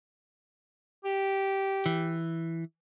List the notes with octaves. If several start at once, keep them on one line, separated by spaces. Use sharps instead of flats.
G4
E3